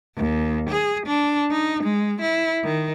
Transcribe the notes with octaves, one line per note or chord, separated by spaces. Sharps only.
D#2
G#4
D4
D#4
G#3
E4
D#3